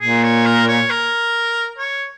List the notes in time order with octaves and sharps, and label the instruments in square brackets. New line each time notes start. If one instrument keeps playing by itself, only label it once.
[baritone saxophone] A#2 [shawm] G#4
[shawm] C#5
A#4
C#5
A#4
C#5